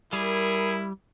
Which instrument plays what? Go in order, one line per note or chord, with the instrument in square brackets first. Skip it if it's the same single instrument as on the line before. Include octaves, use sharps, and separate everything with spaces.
[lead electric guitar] G3 [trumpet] E4 [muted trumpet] G#4 [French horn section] A#4